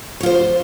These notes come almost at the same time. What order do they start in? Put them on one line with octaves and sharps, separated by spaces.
C#5 F4 C5